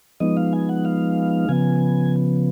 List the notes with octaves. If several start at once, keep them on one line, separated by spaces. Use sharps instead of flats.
F3 G#3 B3 D#4 D#5
F5
G#5
F#5
F5
C#3 F3 B3 G#5